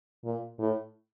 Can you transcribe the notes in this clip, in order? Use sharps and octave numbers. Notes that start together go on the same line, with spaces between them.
A#2
A2